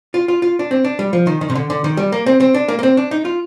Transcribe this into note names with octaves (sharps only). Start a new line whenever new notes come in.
F4
F4
F4
D4
C4
D4
G3
F3
D#3
D#3
C3
D3
D3
D#3
G3
A#3
C4
C4
D4
A#3
A#3
C4
D4
D#4
F4